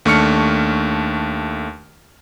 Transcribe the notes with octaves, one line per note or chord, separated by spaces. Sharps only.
D#2 A3 D4 C#6 F6 C#7